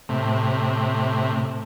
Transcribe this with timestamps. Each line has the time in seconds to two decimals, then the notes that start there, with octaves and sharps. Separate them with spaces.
0.09 A2 C3